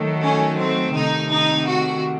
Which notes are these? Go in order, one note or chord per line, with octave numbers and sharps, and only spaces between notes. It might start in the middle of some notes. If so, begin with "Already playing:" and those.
Already playing: D#3 F#3 A3
C#4
C4
C3 D#3 A3 D#4
D#4
F#4